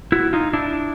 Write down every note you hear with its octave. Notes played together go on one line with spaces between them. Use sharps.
E4 F#4
D#4 F4
D4 E4